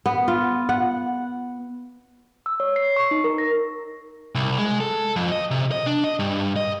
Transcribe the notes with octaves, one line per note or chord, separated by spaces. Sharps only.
B3
F4
F#5
E6
C#5
C7
C#6
D#4
A#4
A#6
C2
G#3
A4
F2
D#5
C3
D#5
D4
D#5
G2
D#5